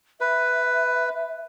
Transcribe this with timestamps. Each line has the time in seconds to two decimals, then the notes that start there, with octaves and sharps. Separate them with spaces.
0.21 B4 E5